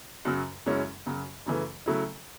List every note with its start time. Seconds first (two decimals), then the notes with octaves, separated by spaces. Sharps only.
0.25 F#2 C#3 F#3
0.66 F#2 C#3 G#3 C#4 E4
1.06 F#2 C#3 F#3
1.46 F#2 C#3 E3 A3
1.86 C#3 F#3 A3 E4